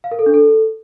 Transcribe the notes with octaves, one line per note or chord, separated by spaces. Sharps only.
F5
A#4
A4
D4
A4